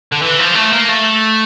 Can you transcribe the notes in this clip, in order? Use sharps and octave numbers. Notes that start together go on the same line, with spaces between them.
D3
E3
F3
A3
A#3
A3